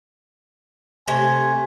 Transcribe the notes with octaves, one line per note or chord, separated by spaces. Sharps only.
C3 A3 G#5